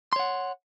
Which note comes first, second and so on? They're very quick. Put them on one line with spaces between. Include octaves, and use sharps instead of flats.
C6 C#5 F#5